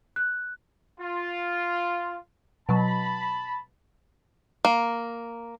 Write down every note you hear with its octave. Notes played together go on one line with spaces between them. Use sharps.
F#6
F4
B2 F#3 A5 B5
A#3